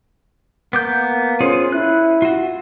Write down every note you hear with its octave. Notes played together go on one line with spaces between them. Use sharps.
A#3 B3 D6 G6
C#4 F4 G#4 C5
E4 F#6
F4 F#4